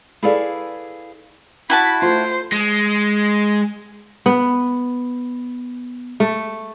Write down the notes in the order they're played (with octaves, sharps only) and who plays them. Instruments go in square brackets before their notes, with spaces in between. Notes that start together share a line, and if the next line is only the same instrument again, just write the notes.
[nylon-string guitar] E4 G#4 A4 B4 D5 F5
[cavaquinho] E4 F#4 A5 [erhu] B5
[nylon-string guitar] A3 F4 [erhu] C5
[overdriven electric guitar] G#3
[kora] B3
A3